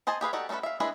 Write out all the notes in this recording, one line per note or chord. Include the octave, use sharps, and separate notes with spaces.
G#4 C5 D#5 G#5 A5
G4 G#4 B4 F5
D#4 F#4 G4 A4 D5
A3 C#4 D#4 A4 B4
E5 F5
G#3 D4 E4 G#4 B4